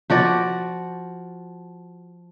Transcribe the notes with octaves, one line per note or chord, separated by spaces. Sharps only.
F3 F#4 D5